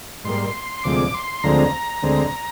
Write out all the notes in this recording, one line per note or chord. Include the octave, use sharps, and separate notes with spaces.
G#2 G3 A#3 C6
D2 C3 F3 G#3 D6
C6
D2 D3 F3 G#3 C4 A#5
D2 D3 G#3 C4